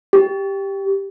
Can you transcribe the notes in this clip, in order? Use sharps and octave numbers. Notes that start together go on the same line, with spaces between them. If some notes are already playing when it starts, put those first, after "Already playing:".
G4